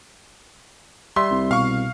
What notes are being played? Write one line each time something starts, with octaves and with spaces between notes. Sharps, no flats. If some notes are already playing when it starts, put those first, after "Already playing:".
G3 E5 C6
C2
B2 F5 C#6